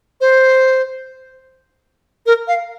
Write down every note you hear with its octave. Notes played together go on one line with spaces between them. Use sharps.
C5
A#4
F5